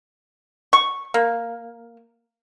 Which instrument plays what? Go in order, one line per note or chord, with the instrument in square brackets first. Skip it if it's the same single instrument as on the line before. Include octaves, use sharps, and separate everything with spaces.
[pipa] C#6
A#3